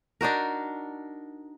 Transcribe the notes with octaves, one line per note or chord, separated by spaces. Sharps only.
D4 D#4 F#4 A#4